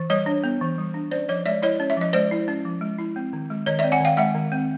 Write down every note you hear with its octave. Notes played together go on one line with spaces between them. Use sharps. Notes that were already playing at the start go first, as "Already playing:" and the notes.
Already playing: E3
G3 C#5 D#5
D4
B3
E3
G3
D4
C#4 C5 D5
F3 C#5 D#5
G#3 D5 E5
E4 C#5 D#5
C#4
E5
F3 D#5
G#3 C5 D5
E4
C#4
F3
G#3
E4
C4
D#3
G#3
D#3 C#5 D#5
D5 E5
C4
F#5 G#5
D#3 F5 G5
G#3 E5 F#5
D#3
C4